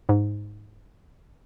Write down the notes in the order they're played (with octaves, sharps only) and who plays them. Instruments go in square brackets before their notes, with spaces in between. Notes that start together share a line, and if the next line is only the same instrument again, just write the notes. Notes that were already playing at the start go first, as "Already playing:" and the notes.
[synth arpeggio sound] G#2